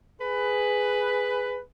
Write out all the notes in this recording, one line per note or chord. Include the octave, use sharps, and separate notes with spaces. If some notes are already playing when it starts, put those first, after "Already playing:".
G#4 B4